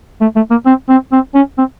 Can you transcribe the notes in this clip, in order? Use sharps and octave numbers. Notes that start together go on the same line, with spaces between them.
A3
A3
A#3
C4
C4
C4
C#4
C4